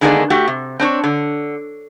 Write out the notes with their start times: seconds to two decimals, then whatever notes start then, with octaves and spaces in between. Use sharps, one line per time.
0.01 D3 D#3 G#3 A#3 B3 D4
0.30 A3 F#4 G4
0.47 C3
0.80 C4 D4 C#5
1.04 D3